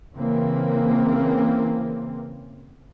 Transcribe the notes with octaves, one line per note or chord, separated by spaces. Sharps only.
C#3 E3 A#3 C4